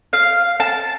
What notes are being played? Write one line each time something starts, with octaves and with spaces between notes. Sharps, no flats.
F5
A5